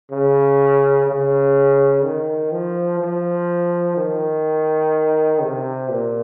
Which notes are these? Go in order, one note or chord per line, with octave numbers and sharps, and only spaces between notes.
C#3
C#3
D#3
F3
F3
D#3
C3
A#2